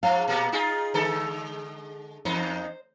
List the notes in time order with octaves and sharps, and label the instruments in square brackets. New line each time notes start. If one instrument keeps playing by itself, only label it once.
[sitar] G#2 F3 [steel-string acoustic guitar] F5
[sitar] A#2 A#3 B3
D#4 F4 G#4
D3 G#3 A4
[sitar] E2 D#4 [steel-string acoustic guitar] C5